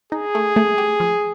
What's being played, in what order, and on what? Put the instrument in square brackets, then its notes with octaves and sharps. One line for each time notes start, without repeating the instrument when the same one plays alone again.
[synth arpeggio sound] D#4 [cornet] G#4
[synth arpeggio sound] A3
A3
G4
F3